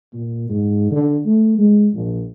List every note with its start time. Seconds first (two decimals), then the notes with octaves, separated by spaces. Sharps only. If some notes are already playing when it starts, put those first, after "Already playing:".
0.13 A#2
0.50 G#2
0.91 D3
1.26 A3
1.58 G#3
1.93 A#1